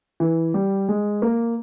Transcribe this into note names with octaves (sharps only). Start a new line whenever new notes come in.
E3
G3
G#3
A#3